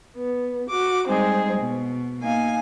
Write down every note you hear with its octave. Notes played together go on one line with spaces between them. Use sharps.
B3
F#4 D6
G3 G#3 C4 D#4 G#4
B2
A#3 D#4 F5 G#5